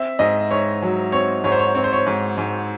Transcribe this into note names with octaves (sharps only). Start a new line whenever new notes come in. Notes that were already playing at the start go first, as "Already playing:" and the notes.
Already playing: C4 E5
G#2 D#5
G#2 C#5
F#3
C4 C#5
G#2 C#5
C5
C#5
C4 C#5
C5
C#5
G#2
G#2